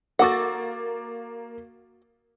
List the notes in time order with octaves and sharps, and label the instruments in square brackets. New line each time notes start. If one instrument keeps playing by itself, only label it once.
[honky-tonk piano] A#3 D6 A6 [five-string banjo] F#4 A4 F#5